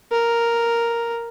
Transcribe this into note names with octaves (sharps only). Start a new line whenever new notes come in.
A#4